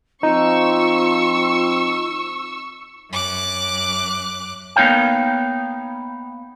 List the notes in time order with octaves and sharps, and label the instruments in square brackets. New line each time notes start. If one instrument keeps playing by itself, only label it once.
[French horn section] F3 C4 [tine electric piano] D#4 [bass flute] F4 [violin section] C#6 E6
[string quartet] F#2 D6 F#6
[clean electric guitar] A#3 B3 D#4 C#5 F5 G5